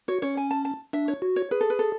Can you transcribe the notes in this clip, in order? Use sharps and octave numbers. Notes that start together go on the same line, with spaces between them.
F#4 C#5
C#4 C#5
G#5
A5
A5
D4 E5
C#5
F#4
C#5
G#4 B4
A4
B4
A4